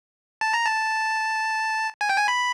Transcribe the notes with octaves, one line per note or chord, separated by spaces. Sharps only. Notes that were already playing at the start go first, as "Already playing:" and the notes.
A5
A#5
A5
G#5
G5
G#5
B5